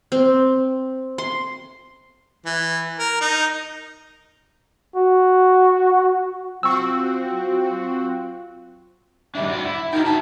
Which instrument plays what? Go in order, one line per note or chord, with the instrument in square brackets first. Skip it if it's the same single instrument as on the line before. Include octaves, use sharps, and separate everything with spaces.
[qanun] C4
C6
[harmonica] E3
A#4
D#4
[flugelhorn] F#4
[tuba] F#3 [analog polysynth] C4 F#4 [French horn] F4 [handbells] C#6 E6
[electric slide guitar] D#3 G3 D4 [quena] E5
[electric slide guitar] F#4 D5
E4
[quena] D#4 [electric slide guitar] F#4 A#4 G5
[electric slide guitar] F#4 E5 [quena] A5